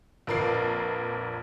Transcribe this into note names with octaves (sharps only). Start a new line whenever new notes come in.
A#1 F2 A#4 B4 D5 C7